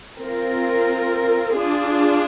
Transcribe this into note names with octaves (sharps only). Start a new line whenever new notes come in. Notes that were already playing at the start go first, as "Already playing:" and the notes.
C4 F4 A#4
D4 F4 G#4